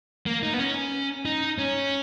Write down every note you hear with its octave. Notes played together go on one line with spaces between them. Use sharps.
A#3
D#4
B3
C#4
D#4
C#4